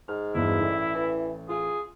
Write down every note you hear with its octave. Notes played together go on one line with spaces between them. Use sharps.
G#2 F6
E2 G2 B2 E4
A1 A4 D5
E3
F4 G#4